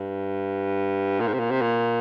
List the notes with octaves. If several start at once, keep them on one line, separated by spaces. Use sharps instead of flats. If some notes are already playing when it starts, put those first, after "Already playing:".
Already playing: G2
A#2
G#2
C3
A#2
C3
A#2